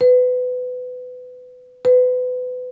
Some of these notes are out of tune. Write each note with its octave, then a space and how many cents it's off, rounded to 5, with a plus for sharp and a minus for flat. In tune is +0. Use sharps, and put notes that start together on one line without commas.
B4 +25
B4 +30